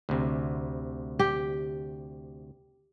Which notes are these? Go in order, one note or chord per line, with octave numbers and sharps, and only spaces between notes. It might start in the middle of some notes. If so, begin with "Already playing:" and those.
D2 C3
G4